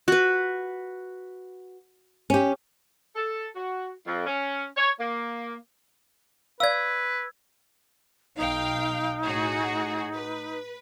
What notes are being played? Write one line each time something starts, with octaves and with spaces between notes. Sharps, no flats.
F#4 B4
C#4 G4
A4
F#4
F2
C#4
C#5
A#3
B4 D5 F5 E6 G#6
B1 D#4 F5 G5
A2 F#4 G#4
B4